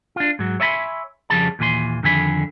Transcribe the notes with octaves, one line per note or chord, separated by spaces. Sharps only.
D4 F4
G#2 F#3
C#5 E5 G#5 A5 B5 C6
F2 C#3 F3 G3 G#4 A5
D#2 A#2 E3 G#5 C6
F2 D3 D#3 G#5 B5